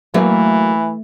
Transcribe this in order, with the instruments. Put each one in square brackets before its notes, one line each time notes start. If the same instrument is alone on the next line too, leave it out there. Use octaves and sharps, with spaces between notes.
[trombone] E3 [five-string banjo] F#3 A#3 B4 [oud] A3